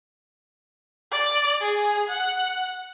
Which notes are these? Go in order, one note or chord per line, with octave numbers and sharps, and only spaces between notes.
D5
G#4
F#5